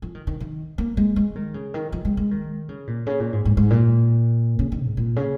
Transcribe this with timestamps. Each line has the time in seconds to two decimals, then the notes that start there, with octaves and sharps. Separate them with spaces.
0.02 F3
0.15 D#3
0.27 D#3
0.40 D#3
0.78 A#3
0.97 G#3
1.16 G#3
1.36 D#3
1.54 C#3
1.74 D#3
1.92 F3
2.05 G#3
2.17 G#3
2.31 D#3
2.69 C#3
2.87 A#2
3.07 C#3
3.20 A#2
3.33 G#2
3.45 G#2
3.57 G#2
3.70 A#2
4.59 C#3
4.72 D#3
4.85 G#2
4.97 A#2
5.16 C#3